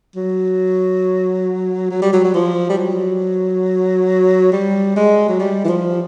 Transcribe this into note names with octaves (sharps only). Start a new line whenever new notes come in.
F#3
F#3
G3
F#3
F#3
F3
G3
F#3
G3
G#3
F#3
G3
E3
F3